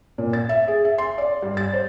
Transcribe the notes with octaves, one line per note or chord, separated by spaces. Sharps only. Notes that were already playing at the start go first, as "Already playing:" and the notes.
A#2
A6
E5
G#4
E5
C6
D5
G2
A6
C5